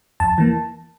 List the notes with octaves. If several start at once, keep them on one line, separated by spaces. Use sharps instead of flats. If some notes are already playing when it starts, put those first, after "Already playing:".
F2 A5
E3 A#3